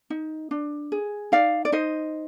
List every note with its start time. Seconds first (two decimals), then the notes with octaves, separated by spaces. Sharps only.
0.10 D#4
0.51 D4
0.92 G#4
1.32 D#4 D5 F5
1.65 D5
1.72 D#4 C5 D#5